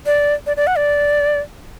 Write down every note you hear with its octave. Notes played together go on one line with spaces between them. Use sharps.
D5
D5
D5
F#5
D5